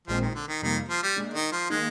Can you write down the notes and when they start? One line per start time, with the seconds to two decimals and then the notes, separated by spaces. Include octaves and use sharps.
0.08 A#1 A#2 F3 G#3 C4
0.21 D#3
0.35 D3
0.48 D#3
0.62 F2 C3 D#3 G3 A#3
0.89 F3
1.03 G3
1.16 A#2 G#3 D4
1.34 D#3
1.52 F3
1.70 D#3 G#3 A#3 D#4